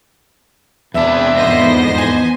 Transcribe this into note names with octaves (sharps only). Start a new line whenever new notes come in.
E2 C4 D4 G#4 B4 E5
F2 G#2 B3 C5 D#5 A#6
G#5